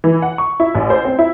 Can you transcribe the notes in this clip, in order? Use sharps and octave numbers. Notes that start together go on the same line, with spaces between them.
E3
F#5
C#6
E4
A1
C5
C4
E4